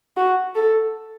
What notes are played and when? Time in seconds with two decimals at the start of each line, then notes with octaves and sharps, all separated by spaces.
0.17 F#4
0.55 A4